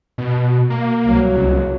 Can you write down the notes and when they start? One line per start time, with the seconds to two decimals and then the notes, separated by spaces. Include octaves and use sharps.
0.18 B2
0.70 A#3
1.06 C2 F#3
1.35 C#2